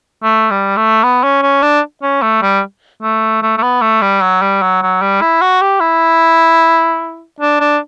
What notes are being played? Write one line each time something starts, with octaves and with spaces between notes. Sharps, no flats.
A3
G3
A3
B3
C#4
C#4
D4
C#4
A3
G3
A3
A3
A3
B3
A3
G3
F#3
G3
F#3
F#3
G3
E4
F#4
G4
E4
D4
D4